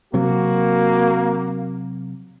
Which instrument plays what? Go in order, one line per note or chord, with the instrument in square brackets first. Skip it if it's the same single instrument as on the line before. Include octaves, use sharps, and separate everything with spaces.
[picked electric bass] C3 F#3 C4 [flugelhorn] A#3 [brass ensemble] F#4